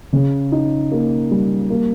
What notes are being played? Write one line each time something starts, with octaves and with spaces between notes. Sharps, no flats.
C#3
D#4
A#3
G3
A#3